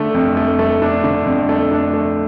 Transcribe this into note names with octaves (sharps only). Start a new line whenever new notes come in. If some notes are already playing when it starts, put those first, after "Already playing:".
Already playing: D3 A3
F2
A3
A3
D4
D3
F2
A3
D4
A3